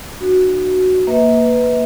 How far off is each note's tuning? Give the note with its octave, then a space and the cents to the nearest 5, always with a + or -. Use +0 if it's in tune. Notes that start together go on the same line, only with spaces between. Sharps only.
D4 +45 F#4 +0
A#3 +0 B4 +5 E5 -40